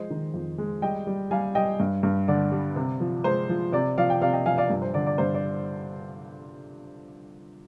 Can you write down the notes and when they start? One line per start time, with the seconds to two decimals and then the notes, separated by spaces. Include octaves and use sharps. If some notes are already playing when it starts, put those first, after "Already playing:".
Already playing: F3 G#3 C5 D#5
0.10 D#3
0.34 F2
0.58 G#3
0.82 G3 D#5 G5
1.07 G3
1.31 G3 F5 G#5
1.55 G3 D#5 G5
1.80 G2
2.03 G2
2.28 D3 D5
2.52 G3
2.76 C3
3.00 F3
3.24 G#3 C5
3.49 F3
3.72 C3 D5
3.98 F3 D5 F5
4.10 G5
4.21 C3 D5 F5
4.33 D#5 G5
4.46 F3 F5 G#5
4.58 D5 F5
4.70 G2
4.82 C5
4.94 D3 D5
5.07 D5
5.18 G2 C5
5.35 D5